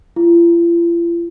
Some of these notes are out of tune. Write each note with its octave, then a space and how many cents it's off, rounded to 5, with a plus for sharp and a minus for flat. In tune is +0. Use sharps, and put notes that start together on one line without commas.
F4 -45